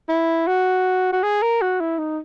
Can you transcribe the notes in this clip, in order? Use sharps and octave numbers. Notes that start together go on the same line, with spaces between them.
E4
F#4
F#4
G#4
A#4
F#4
E4
D#4